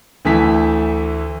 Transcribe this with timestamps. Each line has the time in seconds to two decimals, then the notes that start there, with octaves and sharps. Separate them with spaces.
0.25 D2 E3 A3 A5 B6